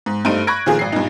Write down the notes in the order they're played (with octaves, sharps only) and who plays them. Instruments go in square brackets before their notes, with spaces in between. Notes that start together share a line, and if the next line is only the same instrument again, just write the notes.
[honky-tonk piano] G#2
G2 A3 D#4 C5 D7 D#7
B5 C#6 F#6 G#6 A#6 D7
A#2 D#3 F3 F4 G#4
G#1 C7
G2 A#2 D#4